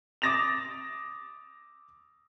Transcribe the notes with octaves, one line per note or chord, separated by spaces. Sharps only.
D6 D#6 A6 A#6 E7 F7